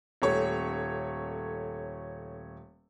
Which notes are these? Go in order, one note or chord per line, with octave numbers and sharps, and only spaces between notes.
D#1 A3 C#5